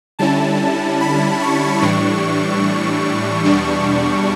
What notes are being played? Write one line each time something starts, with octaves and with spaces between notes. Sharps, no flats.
D3 G3 C#4 E4 A5
B5
C#6
A2 E3 G3 D4 C#6
E2 B2 G3 D4